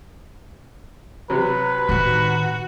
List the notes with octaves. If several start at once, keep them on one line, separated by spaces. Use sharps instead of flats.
C3 F#3 B4
A2 D#3 F#4